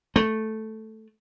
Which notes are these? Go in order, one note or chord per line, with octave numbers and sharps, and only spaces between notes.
A3